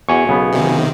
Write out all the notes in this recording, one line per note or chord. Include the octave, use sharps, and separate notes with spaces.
E2 F#4 G#5 C#6
B1 C#3 B3
C3 D#3